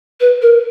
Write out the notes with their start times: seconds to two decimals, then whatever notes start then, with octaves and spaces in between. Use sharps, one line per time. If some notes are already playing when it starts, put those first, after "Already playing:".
0.21 B4
0.42 A#4